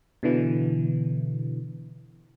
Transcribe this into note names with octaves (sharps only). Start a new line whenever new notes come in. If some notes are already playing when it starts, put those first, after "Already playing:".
B2 D3 E3